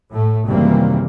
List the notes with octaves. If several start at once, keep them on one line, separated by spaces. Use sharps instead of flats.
A2 A3
F#1 C3 D#3 E3 G3 A#3